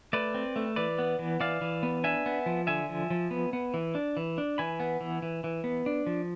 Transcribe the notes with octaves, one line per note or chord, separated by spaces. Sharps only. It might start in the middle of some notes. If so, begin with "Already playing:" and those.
A3 B4 D5
C4
A3
E3 B4 D5
B3
E3
E3 D5 F5
E3
B3
D4 E5 G#5
B3
F3
D3 E5 G#5
F3
F3
B3
B3
E3
D4
E3
D4
E3 G#5 B5
B3
E3
E3
E3
B3
D4
F3